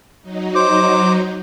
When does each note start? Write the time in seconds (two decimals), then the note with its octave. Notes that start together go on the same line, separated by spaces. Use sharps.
0.22 F#3 D#4
0.55 C5 D6